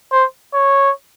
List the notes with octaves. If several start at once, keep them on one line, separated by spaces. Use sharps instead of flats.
C5
C#5